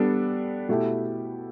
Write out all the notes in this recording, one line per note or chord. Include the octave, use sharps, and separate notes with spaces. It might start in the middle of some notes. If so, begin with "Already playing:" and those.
Already playing: G3 B3 D4 A4
B2 A3 E4 G4